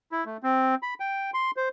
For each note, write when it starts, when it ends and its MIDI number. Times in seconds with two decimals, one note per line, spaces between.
0.12 0.24 64
0.25 0.37 57
0.43 0.75 60
0.82 0.94 83
1.00 1.30 79
1.34 1.51 84
1.57 1.69 72